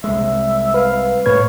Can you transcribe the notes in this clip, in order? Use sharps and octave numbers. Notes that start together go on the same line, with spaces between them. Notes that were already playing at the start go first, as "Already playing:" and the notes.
C2 G#3 E5
B4 F5
A2 B4 C#5 G#6